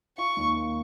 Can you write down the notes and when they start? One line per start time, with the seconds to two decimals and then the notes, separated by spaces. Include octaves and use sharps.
0.18 F4 C#6
0.37 D#2
0.56 A#3